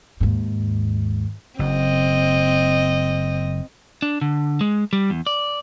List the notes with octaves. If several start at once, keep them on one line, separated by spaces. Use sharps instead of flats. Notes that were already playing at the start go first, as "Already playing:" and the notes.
D#2 G#2
F#1 C4 D#5
D4
D3
G#3
G3
E2
D5